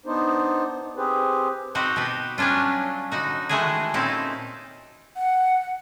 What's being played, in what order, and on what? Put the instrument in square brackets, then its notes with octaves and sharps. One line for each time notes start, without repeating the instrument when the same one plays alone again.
[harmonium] B3 D4 D#4 C5
C4 G4 G#4 B4 C5
[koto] C4 D#4 F#4 G4
B2 F#4 G4 B4
F#3 G3 C#4 D4 F4
D3 D#4 F#4
D#3 E3 G#3 A3 F#4 G#4
A#2 C4 C#4 D#4 E4 A5
[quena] F#5